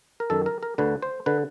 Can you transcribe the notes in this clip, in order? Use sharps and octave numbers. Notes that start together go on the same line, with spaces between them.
A#4
F#2 D#3 A4
A#4
A#4
D2 D3 B4
C5
D3 B4